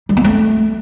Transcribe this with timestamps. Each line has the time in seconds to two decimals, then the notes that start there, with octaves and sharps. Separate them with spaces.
0.09 G3
0.17 B3
0.24 A3